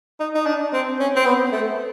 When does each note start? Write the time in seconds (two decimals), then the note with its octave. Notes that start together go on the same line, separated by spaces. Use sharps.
0.20 D#4
0.35 D#4
0.47 D4
0.73 C4
0.99 C#4
1.16 C4
1.26 B3
1.52 A3